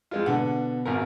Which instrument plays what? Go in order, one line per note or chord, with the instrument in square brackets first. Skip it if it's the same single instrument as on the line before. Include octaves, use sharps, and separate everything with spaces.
[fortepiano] F2 G#3 F4
[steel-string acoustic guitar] B2 [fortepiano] D3 F#5
[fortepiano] G#1 F#2 A#4